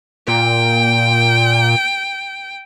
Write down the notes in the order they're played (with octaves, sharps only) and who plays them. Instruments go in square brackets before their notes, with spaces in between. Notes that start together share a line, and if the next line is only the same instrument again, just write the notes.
[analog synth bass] A#2 [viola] G5